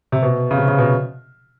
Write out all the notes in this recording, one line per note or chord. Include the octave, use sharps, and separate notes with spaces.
C3
B2
C#3
C3
C#3
B2